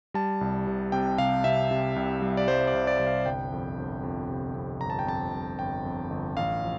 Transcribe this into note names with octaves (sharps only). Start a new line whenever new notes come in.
G3 A5
C2
C3
C3 G5
C3 F5
C3 E5
C3
C2
G3
D5
G3 C5
D5
C2
D5
C2
F5
G1 G5
F2
G1
F2
C3
F2
G1 A#5
A5
G5
F2 A5
G1
G1 G5
F2
G1
A1 F5
F3